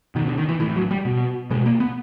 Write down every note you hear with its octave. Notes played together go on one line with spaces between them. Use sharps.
B2 D#3
D3
D#3
E3
A2 E3
F#3
G3
B2
B2 G#3
A#3
B3